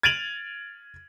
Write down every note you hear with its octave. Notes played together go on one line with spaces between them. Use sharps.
G#6 A6 D7 D#7 F7 F#7